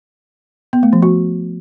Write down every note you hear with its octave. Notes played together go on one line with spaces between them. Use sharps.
B3
A3
F3
F#4